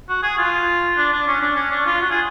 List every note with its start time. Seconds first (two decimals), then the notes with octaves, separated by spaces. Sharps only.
0.09 F#4
0.23 G#4
0.38 F4
0.97 D4
1.12 D4
1.27 C#4
1.41 D4
1.56 C#4
1.71 D4
1.86 F4
2.01 F#4
2.10 G#4